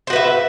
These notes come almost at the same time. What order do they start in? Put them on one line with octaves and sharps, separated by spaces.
C5 F#4 B4 E5